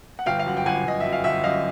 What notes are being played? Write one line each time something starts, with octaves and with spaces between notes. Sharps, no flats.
F#5
G1 F5 G5
F5
F#2 F#5
G5
G1 F#5 G#5
G1 D#5
F#2 E5
F5
G1 E5 F#5
F#2 D#5 F5